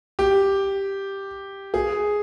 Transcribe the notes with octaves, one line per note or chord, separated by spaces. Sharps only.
G4
G#4